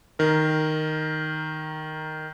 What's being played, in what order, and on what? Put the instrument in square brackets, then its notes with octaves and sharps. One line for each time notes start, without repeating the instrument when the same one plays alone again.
[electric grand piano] D#3 A#4